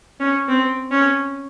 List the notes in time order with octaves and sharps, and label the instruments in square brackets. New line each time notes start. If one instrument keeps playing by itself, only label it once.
[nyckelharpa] C#4
C4
C#4